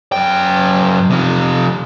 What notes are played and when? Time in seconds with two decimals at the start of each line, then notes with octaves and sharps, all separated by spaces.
0.12 F#2 G5
1.10 C3 F3